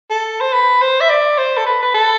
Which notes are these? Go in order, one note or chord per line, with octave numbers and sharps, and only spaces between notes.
A4
C5
B4
C5
E5
D5
C5
A4
B4
B4
A4